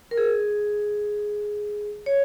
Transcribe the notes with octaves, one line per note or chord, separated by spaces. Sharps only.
A#4
G#4
C#5